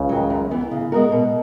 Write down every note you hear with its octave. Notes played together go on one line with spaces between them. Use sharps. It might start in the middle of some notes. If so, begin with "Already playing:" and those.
Already playing: C#2 C#3
D#3 F#3
F#2
E3 B3
C#3
G#3 B3 F#4 A#4
B2